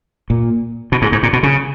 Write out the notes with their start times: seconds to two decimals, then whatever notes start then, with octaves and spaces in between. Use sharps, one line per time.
0.30 A#2
0.92 B2
1.02 G#2
1.12 G#2
1.23 A#2
1.33 B2
1.43 C#3